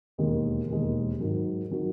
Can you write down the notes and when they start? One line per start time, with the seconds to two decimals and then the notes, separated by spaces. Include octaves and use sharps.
0.18 E1 D#2 D#3 G#3
0.69 E1 D#2 D#3 G#3
1.19 G#2 D#3 F#3
1.71 D#3 F#3